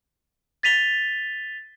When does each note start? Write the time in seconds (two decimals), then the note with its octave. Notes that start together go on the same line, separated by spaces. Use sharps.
0.63 A6 B6 D#7 F7 G7